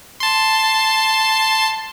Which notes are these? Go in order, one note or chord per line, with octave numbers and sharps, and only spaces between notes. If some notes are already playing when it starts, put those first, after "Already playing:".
A5 C6